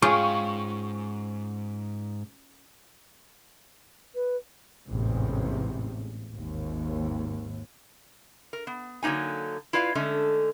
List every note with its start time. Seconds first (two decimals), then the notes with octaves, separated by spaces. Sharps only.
0.02 G#2 C#4 F4 G#4 G5 C#6
4.14 B4
4.88 A1 E2 G#2 C3
6.32 G#1 D#2
8.53 A#4
8.67 B3
9.03 D3 F#3 A#3 D#4 G#5
9.73 E4 F4 B4 D5 F5
9.95 D3 G#3 A3 C#4 A4